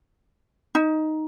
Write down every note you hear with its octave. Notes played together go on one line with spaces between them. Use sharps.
D#4